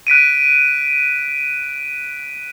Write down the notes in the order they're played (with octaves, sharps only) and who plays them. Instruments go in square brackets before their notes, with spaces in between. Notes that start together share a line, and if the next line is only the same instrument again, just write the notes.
[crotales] F#6 B6 D7 D#7